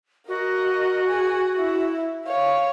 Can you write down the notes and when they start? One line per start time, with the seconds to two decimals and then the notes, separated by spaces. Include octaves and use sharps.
0.28 F#4 A#4 D#5
1.07 G#4 G#5
1.56 E4 E5
2.25 C#5 F5